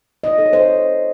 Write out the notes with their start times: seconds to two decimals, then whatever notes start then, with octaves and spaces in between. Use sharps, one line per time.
0.24 D#5
0.31 F4
0.38 A4
0.46 C#5
0.53 C5